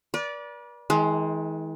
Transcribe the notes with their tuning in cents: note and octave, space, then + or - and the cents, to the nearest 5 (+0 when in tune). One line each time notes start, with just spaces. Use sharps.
B4 -45 D5 -15
E3 -45 G#3 +20